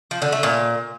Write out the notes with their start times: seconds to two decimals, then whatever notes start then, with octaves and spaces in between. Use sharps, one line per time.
0.11 F3
0.22 D3
0.32 A3
0.43 A#2